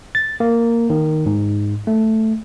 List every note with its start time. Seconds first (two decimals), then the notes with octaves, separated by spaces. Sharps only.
0.15 A6
0.40 A#3
0.90 D#3
1.26 G#2
1.87 A3